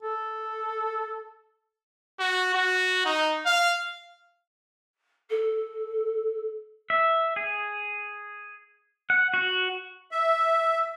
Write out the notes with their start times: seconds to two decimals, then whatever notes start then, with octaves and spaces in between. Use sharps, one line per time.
0.03 A4
2.20 F#4
2.54 F#4
3.06 D#4
3.46 F5
5.29 A4
6.90 E5
7.36 G#4
9.10 F#5
9.34 F#4
10.12 E5